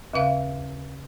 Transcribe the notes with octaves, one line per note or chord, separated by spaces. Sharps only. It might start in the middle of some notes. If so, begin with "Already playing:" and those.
D#2 C#3 E5 F5